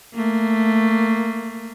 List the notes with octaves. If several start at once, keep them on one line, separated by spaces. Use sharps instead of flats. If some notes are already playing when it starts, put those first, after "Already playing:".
A3 A#3